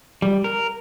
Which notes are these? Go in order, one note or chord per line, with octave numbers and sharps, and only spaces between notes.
G3
A#4